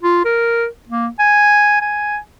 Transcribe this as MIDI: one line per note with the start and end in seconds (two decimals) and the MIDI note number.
0.03 0.24 65
0.25 0.66 70
0.89 1.08 58
1.19 1.80 80
1.81 2.18 80